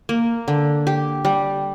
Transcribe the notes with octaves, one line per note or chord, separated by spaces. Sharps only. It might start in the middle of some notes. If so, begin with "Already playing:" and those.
A#3
D3
G4
G3